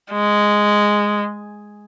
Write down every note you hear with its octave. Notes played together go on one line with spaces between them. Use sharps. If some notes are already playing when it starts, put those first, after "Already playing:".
G#3